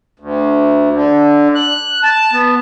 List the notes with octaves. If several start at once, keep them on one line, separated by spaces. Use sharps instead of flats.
D2
D3
F#6
A5
B3